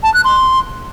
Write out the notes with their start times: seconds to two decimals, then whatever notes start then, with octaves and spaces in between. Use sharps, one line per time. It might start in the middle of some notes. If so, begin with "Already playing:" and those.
0.03 A5
0.14 F#6
0.25 C6